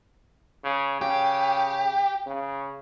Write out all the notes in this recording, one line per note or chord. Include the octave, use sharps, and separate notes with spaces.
C#3
C#3 G4
C#3